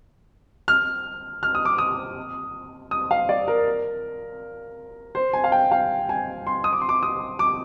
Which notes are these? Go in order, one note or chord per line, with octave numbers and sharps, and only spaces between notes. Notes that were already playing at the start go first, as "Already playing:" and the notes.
F6
F6
D#6
D6
D#6
D#6
F5
D5
A#4
C5
G#5
F5
G5
F5
G#5
C6
D#6
D6
C6
D6
D#6
D6